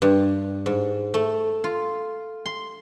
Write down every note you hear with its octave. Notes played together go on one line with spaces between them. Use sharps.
G2
G#2
A3
F4
C6